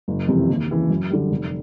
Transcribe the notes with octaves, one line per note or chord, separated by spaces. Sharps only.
F#1
F2 C3 E3
D#2
C#3 E3
F#2
D3 G3
F1